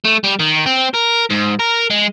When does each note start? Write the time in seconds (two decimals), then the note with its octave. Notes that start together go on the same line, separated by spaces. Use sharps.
0.04 A3
0.24 G3
0.39 D#3
0.66 C4
0.94 A#4
1.30 G#2
1.59 A#4
1.90 G#3